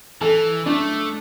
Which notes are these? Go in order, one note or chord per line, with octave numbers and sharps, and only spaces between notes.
E3 A4
A3 D4